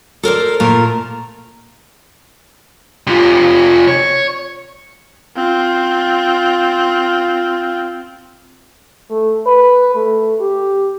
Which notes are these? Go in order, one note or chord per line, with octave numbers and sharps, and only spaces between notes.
A4 A#4 C5 D5
A#2 A3 F4 A#4
C3 F4
C#5
C4 F4
A3
B4
A3
G4